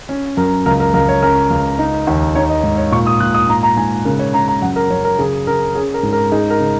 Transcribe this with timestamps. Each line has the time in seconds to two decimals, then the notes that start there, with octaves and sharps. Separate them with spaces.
0.09 C#4
0.37 F#2 A#4
0.66 C#2 A#4
0.80 A#4
0.94 C#2 A#4
1.09 C#5
1.22 C#4 A#4
1.50 C#2
1.79 D#4
2.07 D#2
2.35 D#4 C#5
2.50 D#5
2.63 G#2
2.78 C#5
2.92 A#2 C#6
3.07 D#6
3.20 A#2 F#6
3.34 D#6
3.48 G#2 A#5
3.63 A#5
3.77 G#2 G#5
4.05 C#3 A#4
4.19 C#5
4.34 C#3 A#5
4.48 A#5
4.62 F#2 F#5
4.76 A#4
4.90 F#2 C#5
5.04 A#4
5.19 C#3 G#4
5.47 C#3 A#4
5.75 C#4 G#4
5.94 A#4
6.03 G#2
6.13 A#4
6.32 D#4 G#4
6.50 A#4
6.60 C#3